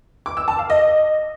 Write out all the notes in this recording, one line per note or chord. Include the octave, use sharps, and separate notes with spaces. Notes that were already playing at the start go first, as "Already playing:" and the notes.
D6
E6
A5
F5
D#5